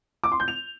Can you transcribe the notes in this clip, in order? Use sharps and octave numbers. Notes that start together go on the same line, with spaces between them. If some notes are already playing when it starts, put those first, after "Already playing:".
D6
C6
G6
F7